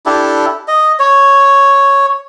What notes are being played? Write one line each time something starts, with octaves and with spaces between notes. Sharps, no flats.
D4 E4 G4 A4
D#5
C#5